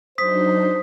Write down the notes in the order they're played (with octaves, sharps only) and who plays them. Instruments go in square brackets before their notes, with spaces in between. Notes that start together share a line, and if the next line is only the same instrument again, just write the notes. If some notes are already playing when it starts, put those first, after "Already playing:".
[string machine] F#3 D4 D#4 [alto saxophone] C5 [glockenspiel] D#6 B6